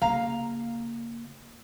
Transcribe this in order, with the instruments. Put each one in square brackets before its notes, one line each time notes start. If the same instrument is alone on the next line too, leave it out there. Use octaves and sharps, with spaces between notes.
[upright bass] C#3 A#3 [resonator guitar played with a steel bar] F5 A#5